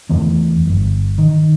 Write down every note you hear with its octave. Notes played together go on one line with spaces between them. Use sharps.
E2 E3 A3 C4
G1 G2
D#3